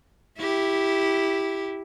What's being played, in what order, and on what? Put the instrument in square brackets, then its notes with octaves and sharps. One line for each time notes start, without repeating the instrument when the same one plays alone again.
[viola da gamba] E4 G4